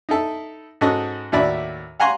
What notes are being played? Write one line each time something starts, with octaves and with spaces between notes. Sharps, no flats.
D#4 E4 A4
G#2 C#4 F#4 A4 D#5
D#2 A2 E4 F#4 D5 B5
F5 F#5 G#5 A#5 C6 C#6